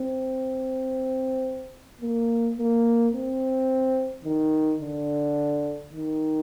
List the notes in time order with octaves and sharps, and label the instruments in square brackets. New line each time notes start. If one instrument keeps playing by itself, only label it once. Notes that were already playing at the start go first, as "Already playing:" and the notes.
Already playing: [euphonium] C4
A#3
A#3
C4
D#3
D3
D#3